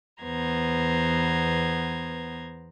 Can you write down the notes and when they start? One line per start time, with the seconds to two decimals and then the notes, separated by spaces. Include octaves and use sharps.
0.22 E2 B3 C5 A#5 G#6